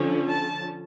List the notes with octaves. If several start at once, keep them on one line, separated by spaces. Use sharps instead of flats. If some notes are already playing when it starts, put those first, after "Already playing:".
Already playing: D3 F3 C#4
A5